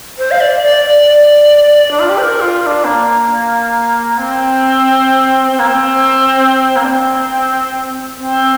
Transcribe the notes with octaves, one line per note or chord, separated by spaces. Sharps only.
C5
F5
D5
D5
D5
D4
F4
G4
C5
A#4
F4
F4
D4
A#3
C4
C4
A#3
C4
A#3
D4
C4
C4